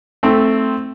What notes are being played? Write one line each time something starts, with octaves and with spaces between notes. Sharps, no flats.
A3 C4